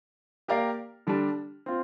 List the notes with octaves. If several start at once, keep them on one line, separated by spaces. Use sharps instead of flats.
A#3 G4 A#4 D5 F5
D3 G3 D4
C4 F4